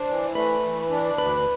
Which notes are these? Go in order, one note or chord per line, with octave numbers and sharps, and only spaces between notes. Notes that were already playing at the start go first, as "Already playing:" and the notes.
Already playing: D4 C5
E3
A3 B4
E3
D4
D2 B4